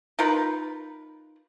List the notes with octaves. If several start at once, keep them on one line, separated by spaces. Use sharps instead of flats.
D#4 F4 A#4 B4